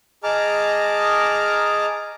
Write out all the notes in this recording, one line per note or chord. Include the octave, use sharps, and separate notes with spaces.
G#4 D#5 A5 A#5 D6 F6